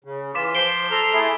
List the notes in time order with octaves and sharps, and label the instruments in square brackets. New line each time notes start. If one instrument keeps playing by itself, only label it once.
[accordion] C#3
[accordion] E3 F4 [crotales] D6 B6 E7
[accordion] F3 [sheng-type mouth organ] C5 [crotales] C7 D7 G7
[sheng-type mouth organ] A4 C6 F6 [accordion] A#5
[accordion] A3 E4 G#4